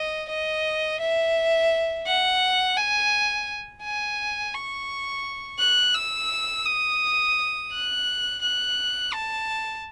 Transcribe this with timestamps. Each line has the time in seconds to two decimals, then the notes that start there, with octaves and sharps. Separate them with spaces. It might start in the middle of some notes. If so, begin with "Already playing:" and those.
Already playing: D#5
0.29 D#5
1.00 E5
2.06 F#5
2.77 G#5
3.83 G#5
4.54 C#6
5.59 F#6
5.95 E6
6.65 D#6
7.72 F#6
8.42 F#6
9.13 A5